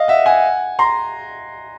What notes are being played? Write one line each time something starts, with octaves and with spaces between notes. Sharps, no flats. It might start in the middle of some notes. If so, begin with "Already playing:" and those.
Already playing: D#5 F5
E5 F#5
F#5 G#5
A#5 C6